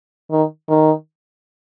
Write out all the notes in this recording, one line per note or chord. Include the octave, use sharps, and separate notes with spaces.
D#3
D#3